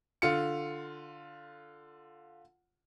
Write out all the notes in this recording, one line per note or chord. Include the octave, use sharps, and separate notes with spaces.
D3 F4 C#7